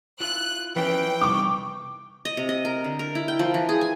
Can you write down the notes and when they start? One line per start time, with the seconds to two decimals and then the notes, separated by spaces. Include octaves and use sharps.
0.20 E4 F4 F#6
0.76 E3 F3 C#4 G5
1.21 C3 G3 D#4 C#6 D6
2.25 D#5
2.37 C3
2.49 D#5
2.65 A#4
2.84 D3
2.99 A#4
3.15 E4
3.28 G5
3.39 F3
3.54 E3
3.69 G#4
3.81 G#5